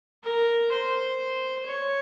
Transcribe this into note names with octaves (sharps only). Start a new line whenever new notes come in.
A#4
C5
C#5